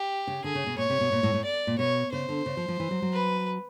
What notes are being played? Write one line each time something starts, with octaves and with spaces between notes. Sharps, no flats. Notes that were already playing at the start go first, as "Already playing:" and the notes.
Already playing: G4
C#3
D3 G#4
C#3
B2
A#2 C#5
C3
B2
A#2
A2
A2
D5
A#2
B2 C#5
C#3 C5
D3
C#3
F3
F3
E3
F#3
F#3
B4